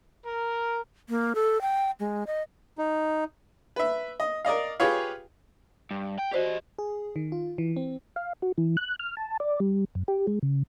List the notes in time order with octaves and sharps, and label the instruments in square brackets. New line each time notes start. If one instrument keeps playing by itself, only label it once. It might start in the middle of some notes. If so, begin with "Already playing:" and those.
[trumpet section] A#4
[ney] A#3
A4
G5
G#3
D#5
[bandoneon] D#4
[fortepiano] B4 E5
D#5
A#4 D5 D#5 F5
F4 G4 G#4 B4 C#5 F5
[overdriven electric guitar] G2
G5
[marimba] F#4 C5 D5 [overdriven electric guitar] G4 D#5
[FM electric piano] G#4
D#3
F4
E3
C4
[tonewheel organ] F5
F#4
E3
F#6
F6
A5
D5
G3
F#2
G4
G#3
C#3